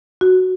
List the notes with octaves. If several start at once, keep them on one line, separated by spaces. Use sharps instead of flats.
F#4